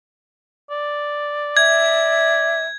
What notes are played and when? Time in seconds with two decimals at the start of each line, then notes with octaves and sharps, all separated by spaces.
0.70 D5
1.57 E5 G#6